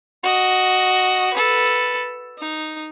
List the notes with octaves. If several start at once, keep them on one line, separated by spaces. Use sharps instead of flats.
F#4 D#5
A4 B4
D#4